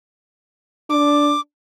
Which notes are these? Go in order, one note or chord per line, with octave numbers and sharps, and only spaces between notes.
D4 D6